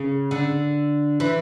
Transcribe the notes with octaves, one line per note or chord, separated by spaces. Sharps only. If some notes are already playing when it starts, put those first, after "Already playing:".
Already playing: C#3
D3
E3